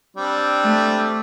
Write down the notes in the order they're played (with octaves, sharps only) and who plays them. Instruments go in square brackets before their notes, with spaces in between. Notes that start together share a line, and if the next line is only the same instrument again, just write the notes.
[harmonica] G3 C4 D4
[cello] A3